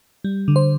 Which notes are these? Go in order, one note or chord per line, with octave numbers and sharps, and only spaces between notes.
G3
D3
C5